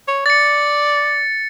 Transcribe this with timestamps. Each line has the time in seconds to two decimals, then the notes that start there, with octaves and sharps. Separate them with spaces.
0.08 C#5
0.26 D5 A6 C#7